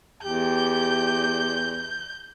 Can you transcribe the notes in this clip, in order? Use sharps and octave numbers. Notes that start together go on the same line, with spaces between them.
E2 G4 G6